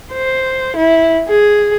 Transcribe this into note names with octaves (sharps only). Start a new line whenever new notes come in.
C5
E4
G#4